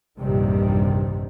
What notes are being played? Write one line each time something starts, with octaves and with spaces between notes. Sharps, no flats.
A#1 E2 G2 C3 D#3 G3